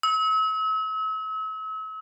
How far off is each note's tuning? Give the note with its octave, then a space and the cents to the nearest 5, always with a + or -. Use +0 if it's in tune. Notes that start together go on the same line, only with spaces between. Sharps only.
E6 -40